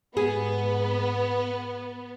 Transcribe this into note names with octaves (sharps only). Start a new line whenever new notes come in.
G#2 B3 G#4